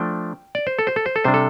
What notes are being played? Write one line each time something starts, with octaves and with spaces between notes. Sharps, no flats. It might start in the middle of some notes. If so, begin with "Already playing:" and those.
Already playing: F3 A3 D4 G5
D5
C5
A4
C5
A4
C5
A4
C3 G3 D4 C5
A4